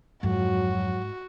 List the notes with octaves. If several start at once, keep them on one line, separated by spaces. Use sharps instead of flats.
F2 G#2 F#3 F#4